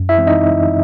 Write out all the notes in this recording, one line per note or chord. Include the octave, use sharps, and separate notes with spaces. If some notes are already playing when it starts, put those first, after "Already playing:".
Already playing: F#2
E4 E5
E3 G#3 C4
D#4 D#5